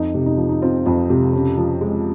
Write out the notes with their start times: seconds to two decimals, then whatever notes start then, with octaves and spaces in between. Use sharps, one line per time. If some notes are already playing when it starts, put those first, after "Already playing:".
Already playing: F2 D#4
0.14 C3
0.26 D#4
0.38 F3
0.49 D#4
0.62 C4 F4
0.86 F2 F4
1.09 C3 F4
1.33 C#3
1.57 F3
1.81 G#3